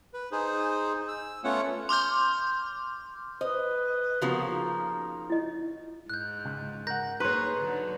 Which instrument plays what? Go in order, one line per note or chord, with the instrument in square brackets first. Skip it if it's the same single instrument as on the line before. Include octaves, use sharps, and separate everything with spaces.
[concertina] B4
D#4 G#4 C5
E6
A3 B3 C#4 F4 C#5 F#5
[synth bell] C6 D6 F6 G6
[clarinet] B4 [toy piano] C5 [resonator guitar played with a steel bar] D#5
[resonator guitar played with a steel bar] C#3 F3 A#3 [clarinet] B3 [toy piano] F#4 G4
[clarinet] D#4
[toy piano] E4 D#5
[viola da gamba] G#2 [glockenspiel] F#6 G6
[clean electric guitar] C#2
[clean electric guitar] A#4 F#5 [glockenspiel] G6 A#6
[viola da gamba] A#3 G#4 [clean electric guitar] D#4 C6 [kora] B4 C#5
[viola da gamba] D3 F#3